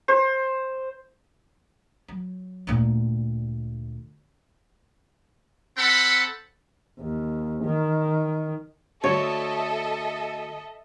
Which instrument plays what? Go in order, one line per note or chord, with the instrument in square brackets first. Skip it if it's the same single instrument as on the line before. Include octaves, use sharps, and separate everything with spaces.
[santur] C5
[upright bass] F#3
D2 A#2
[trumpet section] C4 A4 F#5 B5
[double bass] D#2
D#3
[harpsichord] D2 [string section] A4 D#5 E5 [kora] C#5